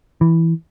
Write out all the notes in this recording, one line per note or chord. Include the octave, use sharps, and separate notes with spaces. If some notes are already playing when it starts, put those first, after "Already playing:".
E3